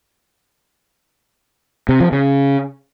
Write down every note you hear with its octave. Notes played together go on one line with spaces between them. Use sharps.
C3
F3
C#3